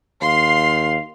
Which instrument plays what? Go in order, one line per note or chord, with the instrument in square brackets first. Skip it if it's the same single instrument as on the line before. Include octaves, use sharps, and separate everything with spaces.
[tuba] D#2 [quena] F5 [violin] C6 C7